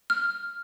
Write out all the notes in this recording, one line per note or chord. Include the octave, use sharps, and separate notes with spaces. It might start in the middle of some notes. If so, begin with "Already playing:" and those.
F6